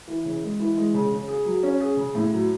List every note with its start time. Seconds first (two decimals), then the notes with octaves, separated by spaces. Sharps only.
0.08 E3
0.25 C#3
0.43 G#3
0.59 E3
0.77 G#3
0.94 C#3
1.12 C#3
1.28 G#4
1.45 F#3
1.63 C#4
1.81 G#4
1.97 C#3
2.15 A2
2.32 F#3